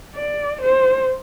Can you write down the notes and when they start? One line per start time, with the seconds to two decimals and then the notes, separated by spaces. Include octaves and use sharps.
0.15 D5
0.61 C5